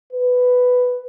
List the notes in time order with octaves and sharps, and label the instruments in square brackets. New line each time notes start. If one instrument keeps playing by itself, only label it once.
[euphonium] B4